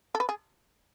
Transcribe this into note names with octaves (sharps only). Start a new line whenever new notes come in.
A4
B4
G#4